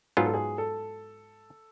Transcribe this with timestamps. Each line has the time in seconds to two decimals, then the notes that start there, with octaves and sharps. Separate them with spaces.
0.17 G#2 F#3 B3 F4 G#4
0.25 A4
0.34 G#4
0.58 A4